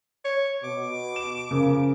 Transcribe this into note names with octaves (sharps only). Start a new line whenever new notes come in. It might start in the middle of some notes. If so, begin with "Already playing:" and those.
C#5
B2 D6
E7
C#3 F3 F4 A#4